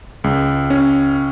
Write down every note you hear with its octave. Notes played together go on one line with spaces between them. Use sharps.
C#2
C#4